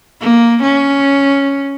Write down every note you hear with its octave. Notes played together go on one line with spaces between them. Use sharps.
A#3
C#4